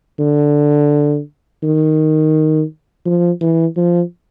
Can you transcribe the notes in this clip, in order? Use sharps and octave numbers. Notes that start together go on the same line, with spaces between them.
D3
D#3
F3
E3
F3